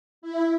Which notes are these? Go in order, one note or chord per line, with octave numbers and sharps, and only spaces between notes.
E4